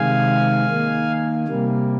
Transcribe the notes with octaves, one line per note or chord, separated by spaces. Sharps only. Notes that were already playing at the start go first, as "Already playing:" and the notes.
Already playing: C3 D#3 G#3 F5 G#5
D#3 A#3
C3 G3 A#3